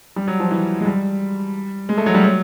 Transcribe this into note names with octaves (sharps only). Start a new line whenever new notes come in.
G3
F#3
F3
E3
G#3
G3
G#3
A3
F#3
G3
F#3